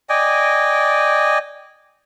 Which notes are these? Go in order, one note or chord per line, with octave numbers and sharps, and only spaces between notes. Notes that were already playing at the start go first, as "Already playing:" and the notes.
D5 D#5 G5 G#5